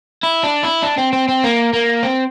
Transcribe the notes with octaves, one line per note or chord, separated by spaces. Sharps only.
E4
D4
E4
D4
C4
C4
C4
A#3
A#3
C4